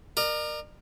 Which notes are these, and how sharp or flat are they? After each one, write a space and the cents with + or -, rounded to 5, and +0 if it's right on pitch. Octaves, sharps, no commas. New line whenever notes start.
A#4 +0 D5 +45